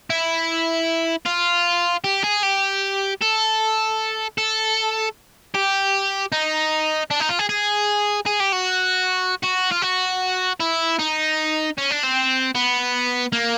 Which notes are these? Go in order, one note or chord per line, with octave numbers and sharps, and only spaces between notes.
E4
F4
G4
G#4
G4
A4
A4
G4
D#4
D4
D#4
F4
G#4
G#4
G#4
G4
F#4
F#4
F4
F#4
E4
D#4
C#4
D4
C4
B3
A#3